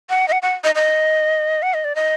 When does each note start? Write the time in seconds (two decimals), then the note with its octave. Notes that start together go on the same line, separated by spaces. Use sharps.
0.10 F#5
0.28 D#5
0.32 F#5
0.42 F#5
0.64 D#5
0.75 D#5
1.62 F#5
1.74 D#5
1.84 D5
1.95 D#5